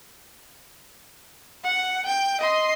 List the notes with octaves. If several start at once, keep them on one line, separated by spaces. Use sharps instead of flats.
F#5
G5
D#5 C6